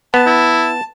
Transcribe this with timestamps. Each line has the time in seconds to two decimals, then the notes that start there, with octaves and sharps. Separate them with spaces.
0.14 B3 A5
0.26 E4